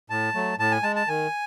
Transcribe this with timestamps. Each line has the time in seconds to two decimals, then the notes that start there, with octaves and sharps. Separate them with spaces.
0.10 A2 A5
0.34 F#3 A3
0.58 A2 A5
0.72 G#5
0.83 G#3 A5
0.96 A5
1.08 D#3 G#5